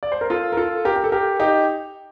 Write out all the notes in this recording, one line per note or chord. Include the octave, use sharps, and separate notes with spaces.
D5
C5
A#4
F4 A4
A#4
F4 A4
G4 A#4
G4
A4
G4 A#4
D#4 G4